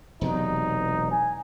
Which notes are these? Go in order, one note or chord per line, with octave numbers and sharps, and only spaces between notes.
E1 C3 F#3 D#4
G#5